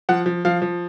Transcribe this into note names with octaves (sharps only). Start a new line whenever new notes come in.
F3 F#5
F3
F3 F5
F3